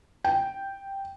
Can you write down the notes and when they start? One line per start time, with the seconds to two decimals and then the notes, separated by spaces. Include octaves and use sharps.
0.24 G5